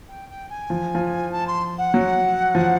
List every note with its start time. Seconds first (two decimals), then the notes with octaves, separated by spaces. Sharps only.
0.09 G5
0.29 G5
0.50 G#5
0.70 F3
0.95 F3
1.32 A5
1.47 C6
1.78 F#5
1.94 F#3
2.55 F3